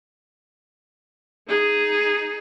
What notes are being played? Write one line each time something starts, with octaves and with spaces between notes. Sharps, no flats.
D#4 G#4